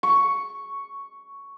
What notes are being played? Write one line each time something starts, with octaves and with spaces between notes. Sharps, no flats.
C#6